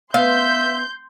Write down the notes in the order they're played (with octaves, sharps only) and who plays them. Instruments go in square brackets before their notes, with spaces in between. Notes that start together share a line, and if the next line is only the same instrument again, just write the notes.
[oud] B3 [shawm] E5 [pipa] F5 [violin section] C6 G6